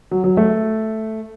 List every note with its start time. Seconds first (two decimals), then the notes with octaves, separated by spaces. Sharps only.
0.11 F#3
0.24 F#3
0.37 A3